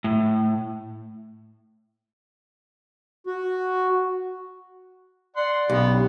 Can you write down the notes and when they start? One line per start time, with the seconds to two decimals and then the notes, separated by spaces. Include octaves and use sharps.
0.04 A2
3.27 F#4
5.36 D5 F#5 C6
5.69 B1 D3 B3 C#4 G4